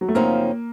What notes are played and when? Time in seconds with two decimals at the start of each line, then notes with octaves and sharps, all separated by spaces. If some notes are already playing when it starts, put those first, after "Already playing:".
0.01 F#3
0.08 A3
0.15 F#2 C#3 F3 A#3 C4 D#4